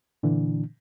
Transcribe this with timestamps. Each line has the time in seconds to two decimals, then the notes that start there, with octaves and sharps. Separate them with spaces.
0.23 A#2 D3 E3 D4